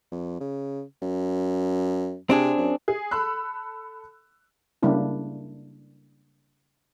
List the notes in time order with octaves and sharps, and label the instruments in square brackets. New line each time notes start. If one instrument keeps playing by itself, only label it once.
[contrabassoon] F2
C#3
F#2
[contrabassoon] C3 [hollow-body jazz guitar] C4 D4 G#4
[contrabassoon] F#2
[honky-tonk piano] G#4
A4 B5 E6 F#6
[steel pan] C#3 G3 A#3 D4 E4